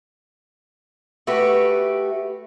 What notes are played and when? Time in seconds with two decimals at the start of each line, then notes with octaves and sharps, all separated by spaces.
1.27 A3 F#4 G4 B4